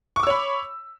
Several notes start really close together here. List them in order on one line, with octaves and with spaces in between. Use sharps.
C#6 D6 E6 C#5 B5